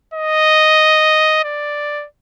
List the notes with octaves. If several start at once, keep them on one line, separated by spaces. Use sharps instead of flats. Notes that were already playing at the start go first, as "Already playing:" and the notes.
D#5
D5